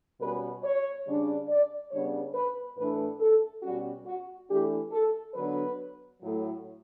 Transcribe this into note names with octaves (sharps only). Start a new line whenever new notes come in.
B2 G3 C#4 B4
C#5
C#3 G3 D4
D5
C#3 G3 B3 D4 C#5
B4
A2 E3 A3 D4 B4
A4
B2 G3 C#4 F#4
F#4
E3 A3 D4 G4
A4
D3 F#3 B3 D4 B4
A2 F#3 A3